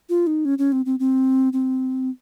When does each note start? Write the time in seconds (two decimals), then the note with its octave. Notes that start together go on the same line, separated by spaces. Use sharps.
0.09 F4
0.27 D#4
0.45 C#4
0.58 C#4
0.72 C4
0.86 C4
1.00 C4
1.53 C4